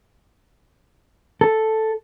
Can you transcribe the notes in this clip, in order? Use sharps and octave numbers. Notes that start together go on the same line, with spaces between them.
A4